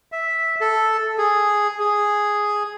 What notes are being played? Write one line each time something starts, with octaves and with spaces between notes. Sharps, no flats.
E5
A4
G#4
G#4